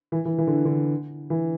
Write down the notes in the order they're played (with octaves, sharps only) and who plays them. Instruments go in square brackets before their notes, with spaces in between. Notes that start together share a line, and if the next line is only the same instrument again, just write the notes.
[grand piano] E3
E3
E3
D3
D3
E3